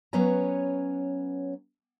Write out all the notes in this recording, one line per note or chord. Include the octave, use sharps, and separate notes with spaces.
F#3 B3 C#4 B4 C#5 A#5